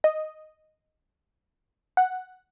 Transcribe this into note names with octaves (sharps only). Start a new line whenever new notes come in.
D#5
F#5